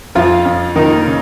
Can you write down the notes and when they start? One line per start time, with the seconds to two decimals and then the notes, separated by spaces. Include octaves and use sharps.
0.15 F2 F3 F4
0.45 F2
0.75 D#3 A#3 D#4
1.06 C#3